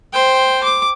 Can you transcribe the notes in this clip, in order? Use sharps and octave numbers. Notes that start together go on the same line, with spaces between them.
C5 G5
D6